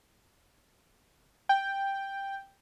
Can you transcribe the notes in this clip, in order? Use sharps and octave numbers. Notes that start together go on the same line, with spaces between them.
G5